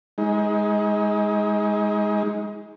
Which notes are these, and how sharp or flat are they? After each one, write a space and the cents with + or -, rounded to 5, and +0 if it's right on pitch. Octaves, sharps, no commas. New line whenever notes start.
G#3 -5 D#4 +30